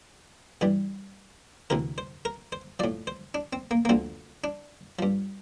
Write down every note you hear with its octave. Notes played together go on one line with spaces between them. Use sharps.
G2 E3 G3
D2 C3 E3 A#4
C5
A#4
C5
A2 F3 D5
C5
D4
C4
A#3
A#3
D2 D3 F3 C4
D4
G2 F3